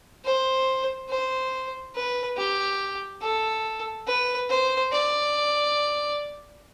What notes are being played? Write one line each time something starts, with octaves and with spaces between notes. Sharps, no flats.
C5
C5
B4
G4
A4
B4
C5
D5